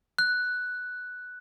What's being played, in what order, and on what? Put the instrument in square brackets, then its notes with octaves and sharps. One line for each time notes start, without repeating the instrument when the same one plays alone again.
[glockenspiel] F#6